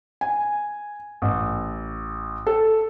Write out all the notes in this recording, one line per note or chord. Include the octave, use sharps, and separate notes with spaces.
G#5
A1
A4